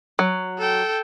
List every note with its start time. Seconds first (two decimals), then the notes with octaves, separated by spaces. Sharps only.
0.19 F#3
0.58 A4 G5